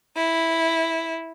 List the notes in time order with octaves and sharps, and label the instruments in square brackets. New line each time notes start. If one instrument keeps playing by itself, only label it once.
[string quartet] E4